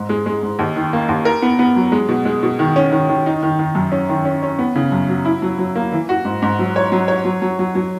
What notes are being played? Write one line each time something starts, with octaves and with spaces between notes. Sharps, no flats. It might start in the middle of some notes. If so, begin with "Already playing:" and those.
Already playing: G#2
G#3
G#3
G#2
D#2
D#3
A#3
D#2
A#4
B3
B3
F#3
G#3
B2
G#3
B2
D#3
C#4
D#3
D#3
D#4
D#3
D#3
F#2
C#4
D#3
C#4
C#4
B3
C#3
F#2
F#3
E4
F#3
F#3
A#3
E3
F#4
G#2
G#2
F#3
C#5
F#3
C#5
F#3
F#3
F#3
F#3